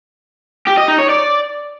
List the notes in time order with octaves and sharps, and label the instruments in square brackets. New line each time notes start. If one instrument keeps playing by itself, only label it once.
[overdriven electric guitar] G4
D#5
D#4
C#5
D5